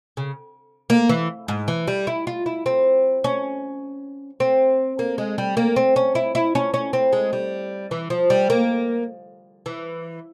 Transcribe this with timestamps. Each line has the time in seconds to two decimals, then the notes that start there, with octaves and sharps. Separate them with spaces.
0.17 C#3
0.90 A#3
1.09 E3
1.48 G#2
1.68 E3
1.88 G3
2.07 E4
2.27 F4
2.46 E4
2.66 C4
3.24 C#4
4.40 C4
4.99 A#3
5.18 G#3
5.38 G3
5.57 A#3
5.76 C4
5.96 C#4
6.15 E4
6.35 E4
6.55 C#4
6.74 C#4
6.93 C4
7.13 G#3
7.33 G3
7.91 E3
8.10 F3
8.30 G3
8.50 A#3
9.66 E3